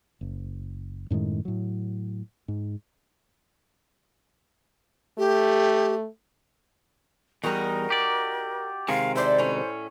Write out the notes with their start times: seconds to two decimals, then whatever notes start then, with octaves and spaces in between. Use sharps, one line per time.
0.21 F#1
1.11 F#2 A2 D#3 G#3
1.45 A2 F#3
2.48 G#2
5.18 A3 G4
7.44 E2 G3 D#4 F#4 A#4
7.90 G4 D5
8.88 C3 D#3 G#3 F5
9.16 E4 C5 D5
9.38 A2 C#4